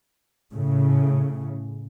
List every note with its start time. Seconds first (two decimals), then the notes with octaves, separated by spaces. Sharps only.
0.53 A2 C#3